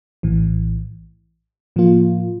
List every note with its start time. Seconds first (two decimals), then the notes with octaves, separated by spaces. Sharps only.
0.23 A#1 A2 E3
1.76 A2 F3 A#3 F4